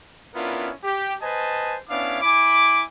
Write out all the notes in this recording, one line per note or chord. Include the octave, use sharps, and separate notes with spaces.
B3 C#4 D4 E4 F4 A#4
G4
B4 C5 D#5 G#5 A5
B3 C#4 D4 E4 F5 D6
E4 G#5 B5 D6